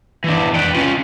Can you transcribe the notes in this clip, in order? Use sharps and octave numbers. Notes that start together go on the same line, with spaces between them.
E3 D4
B4 G5
C#4 F4